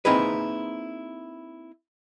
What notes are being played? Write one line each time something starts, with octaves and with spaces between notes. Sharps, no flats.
A#3 C4 D#4 E4 G#4 B4